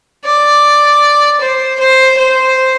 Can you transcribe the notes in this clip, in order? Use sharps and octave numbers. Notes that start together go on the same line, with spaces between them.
D5
C5
C5
C5